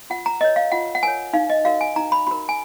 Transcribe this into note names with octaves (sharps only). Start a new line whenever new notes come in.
F4 F#5
A#5
A#4 C#5 D#5
F5
F4 F#5
F#5
A#4 C#5 G#5
D#4 F5
D#5
F#4 A#4 F5
G#5
D#4 A#5
B5
F#4 A#4 B5
G#5